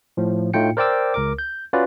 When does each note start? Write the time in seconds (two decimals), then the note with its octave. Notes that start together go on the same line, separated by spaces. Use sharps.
0.17 A2 F3
0.54 A2 A3 D#4 F4 G5 C#7
0.77 A#4 C5 D5 G5 D6 E6
1.14 C#2 A#4 D6
1.39 G6
1.73 C#4 F4 F#4 B4 D5